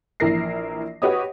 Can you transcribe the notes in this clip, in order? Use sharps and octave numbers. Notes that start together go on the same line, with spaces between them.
A#1 E3 E4 A#4 A#6 C7
F#4 G4 B4 C#5 D#5 D#6